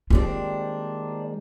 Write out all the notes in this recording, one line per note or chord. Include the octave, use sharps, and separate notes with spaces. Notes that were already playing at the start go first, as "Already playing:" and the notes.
D#3 G3 G#3 A#3 C4 D4 F4